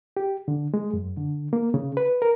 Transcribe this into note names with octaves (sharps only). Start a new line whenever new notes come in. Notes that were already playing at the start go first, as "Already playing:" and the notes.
G4
D3
G#3
F#2
D3
A#3
C#3
B4
A#4